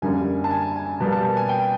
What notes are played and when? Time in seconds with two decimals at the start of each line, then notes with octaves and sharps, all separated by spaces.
0.02 F#2 D3 G3 A#3 G#5
0.44 A5
0.51 G#5
0.76 G#5
1.00 B2 G3 A#3 A5
1.12 A5
1.24 A5
1.37 G#5
1.49 G5